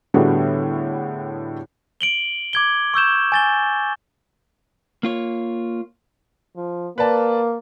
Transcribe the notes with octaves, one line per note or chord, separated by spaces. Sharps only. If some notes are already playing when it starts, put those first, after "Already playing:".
A2 D3 G3 B3 F#4 G#4
D7 F#7 G7
D6 G#6 G7
C#6 E6 G6 E7
G#5 A6 G7
A#3 F4 C#5
F3
A#3 B4 D5 A5